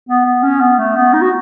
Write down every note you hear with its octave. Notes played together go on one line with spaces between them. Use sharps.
B3
B3
C#4
B3
A3
B3
D#4
F#4